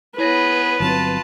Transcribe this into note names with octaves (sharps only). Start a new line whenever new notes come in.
B3 E4 G#4 B4 C#5 A#6
G1 F#3 C4 F4 A5